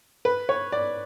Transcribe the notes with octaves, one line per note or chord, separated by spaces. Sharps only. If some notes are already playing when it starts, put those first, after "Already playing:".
B4
C#5
D5